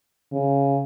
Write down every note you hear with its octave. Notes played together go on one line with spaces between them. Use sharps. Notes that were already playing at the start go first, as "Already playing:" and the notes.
C#3